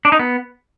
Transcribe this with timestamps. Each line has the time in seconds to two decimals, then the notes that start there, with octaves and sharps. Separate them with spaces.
0.05 D4
0.12 D#4
0.19 B3